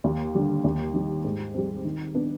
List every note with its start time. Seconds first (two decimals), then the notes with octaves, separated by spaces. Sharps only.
0.04 D#2
0.35 D3 G3
0.64 D#2
0.94 D#3 G3
1.25 G#2
1.54 G3 C4
1.85 D#3
2.14 B3 D4